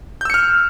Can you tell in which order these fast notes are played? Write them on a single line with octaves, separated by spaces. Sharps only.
G6 E6 C#7 F6